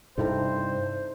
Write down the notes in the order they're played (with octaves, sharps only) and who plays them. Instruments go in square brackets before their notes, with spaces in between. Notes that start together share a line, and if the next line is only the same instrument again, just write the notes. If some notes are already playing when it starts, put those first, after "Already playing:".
[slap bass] G2 C3 [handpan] D#4 E4 A4 [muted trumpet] C5